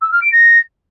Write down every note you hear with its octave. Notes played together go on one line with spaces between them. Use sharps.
E6
F6
D7
A#6